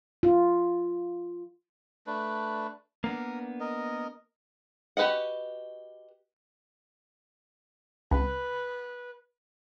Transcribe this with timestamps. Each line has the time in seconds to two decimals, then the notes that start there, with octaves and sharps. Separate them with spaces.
0.23 F4
2.07 A3 D4 B4
3.04 A#3 B3 D4 A#4
3.60 A#4 D#5
4.97 F#4 G4 B4 D#5 F#5
8.11 C#2 B4